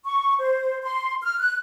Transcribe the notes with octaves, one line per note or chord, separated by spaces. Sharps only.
C#6
C5
C6
F6
F#6